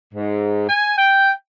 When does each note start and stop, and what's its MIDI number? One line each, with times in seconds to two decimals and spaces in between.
0.13 0.65 44
0.68 0.97 80
0.97 1.30 79